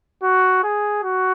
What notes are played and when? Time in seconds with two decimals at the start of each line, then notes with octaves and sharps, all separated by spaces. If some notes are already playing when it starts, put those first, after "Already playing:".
0.23 F#4
0.63 G#4
1.03 F#4